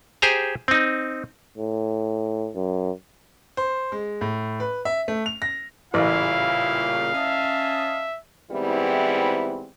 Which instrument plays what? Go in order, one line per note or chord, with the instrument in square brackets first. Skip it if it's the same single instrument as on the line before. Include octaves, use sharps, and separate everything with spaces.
[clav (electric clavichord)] G4 G#4 C5 G#5 A#5
C4 D#4
[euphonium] A2
F#2
[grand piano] C5
G#3
A2
B4
E5
A3
F7
A#6
[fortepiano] A1 E3 [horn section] A#2 C#3 G3 [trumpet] E4 [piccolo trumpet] F5
[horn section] C#4 D#5 A5 [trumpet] E5
[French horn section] G#2 E3 G3 B3 C4 E4